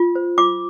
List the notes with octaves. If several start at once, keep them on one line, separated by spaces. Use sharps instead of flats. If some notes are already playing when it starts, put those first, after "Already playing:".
Already playing: F4
C5
F4 D6